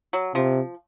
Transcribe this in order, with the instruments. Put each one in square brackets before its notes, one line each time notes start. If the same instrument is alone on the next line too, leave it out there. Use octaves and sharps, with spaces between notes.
[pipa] F#3
[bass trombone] C3 [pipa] F3